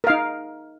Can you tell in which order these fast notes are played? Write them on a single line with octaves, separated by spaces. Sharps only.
A#4 F5 D#4